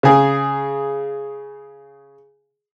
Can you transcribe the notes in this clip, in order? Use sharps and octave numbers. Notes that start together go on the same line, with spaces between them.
C#3 G#4